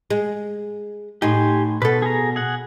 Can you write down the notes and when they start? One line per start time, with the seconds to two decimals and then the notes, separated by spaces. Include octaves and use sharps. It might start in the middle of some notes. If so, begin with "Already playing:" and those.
0.10 G#3
1.22 A2 D#4 G4 G#5 C6
1.82 B2 A4 B4
2.02 G#4 A#5
2.36 G#4 F#5